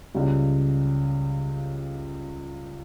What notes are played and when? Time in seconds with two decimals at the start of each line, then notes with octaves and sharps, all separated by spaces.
0.14 C#2 C#3 G3